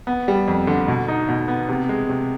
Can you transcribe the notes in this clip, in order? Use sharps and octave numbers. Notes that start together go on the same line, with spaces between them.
B3
G3
F2
D3
B2
D#4
B2
B3
C3
G#3
C3